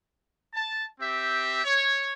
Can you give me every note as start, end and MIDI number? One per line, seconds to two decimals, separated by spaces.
0.54 0.85 81
0.99 1.60 60
0.99 1.60 67
0.99 1.60 76
1.63 2.13 73